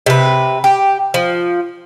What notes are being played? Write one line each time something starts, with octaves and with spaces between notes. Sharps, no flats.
C3 B4
G4
F3